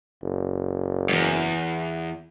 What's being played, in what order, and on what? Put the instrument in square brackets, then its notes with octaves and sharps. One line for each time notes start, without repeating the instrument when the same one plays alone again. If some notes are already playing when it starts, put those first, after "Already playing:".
[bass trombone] F#1
[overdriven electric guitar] E2 G2